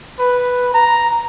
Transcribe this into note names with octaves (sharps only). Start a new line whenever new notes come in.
B4
A#5